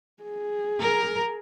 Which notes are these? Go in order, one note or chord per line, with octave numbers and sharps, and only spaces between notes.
G#4
A#4